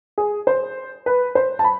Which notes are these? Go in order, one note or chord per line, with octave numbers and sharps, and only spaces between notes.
G#4
C5
B4
C5
A5
B5